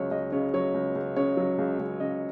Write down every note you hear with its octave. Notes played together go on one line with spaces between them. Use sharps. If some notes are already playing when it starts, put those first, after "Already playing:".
Already playing: C#2 C#3 F#3 C#5
C#2 D#5
C#3 C#5
F#3 C#5
C#2
C#2
C#3 C#5
F#3
C#2
C#2
C#3 D#5